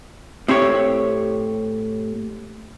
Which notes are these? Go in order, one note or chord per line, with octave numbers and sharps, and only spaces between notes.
A2 C4 G4 C#5